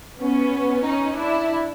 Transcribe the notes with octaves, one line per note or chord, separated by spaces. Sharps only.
B3 C#4
C#4 D#4
D4 E4